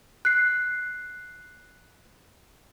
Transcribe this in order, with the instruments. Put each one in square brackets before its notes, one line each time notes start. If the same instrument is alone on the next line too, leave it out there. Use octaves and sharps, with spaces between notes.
[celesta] F#6 C7